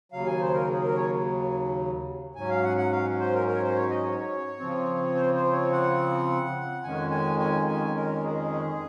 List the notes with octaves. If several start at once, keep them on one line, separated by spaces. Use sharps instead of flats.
D#2 C#3 F#3 F5
G#5
C5
A#4
G#4
A#4
C#5
G#2 F#3 C#4 G#5
F5
F#5
F#5
F5
C5
A#4
A#4
C#5
C5
C#5
D#5
C#5
C#3 F3 C4
C5
C5
C#5
F#5
F2 D#3 G#3 C#4 G#5
G#5
G#5
G#5
A#4
G#4